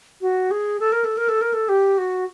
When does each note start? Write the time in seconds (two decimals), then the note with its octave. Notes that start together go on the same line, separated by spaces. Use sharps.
0.21 F#4
0.51 G#4
0.80 A4
0.92 A#4
1.04 A4
1.17 A#4
1.29 A4
1.41 A#4
1.53 A4
1.69 G4
1.98 F#4